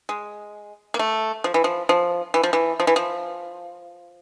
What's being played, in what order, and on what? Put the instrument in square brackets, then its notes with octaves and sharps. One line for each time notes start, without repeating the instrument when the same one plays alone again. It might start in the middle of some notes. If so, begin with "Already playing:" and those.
[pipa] G#3
A#3
A3
F3
E3
F3
F3
E3
F3
E3
F3
E3
F3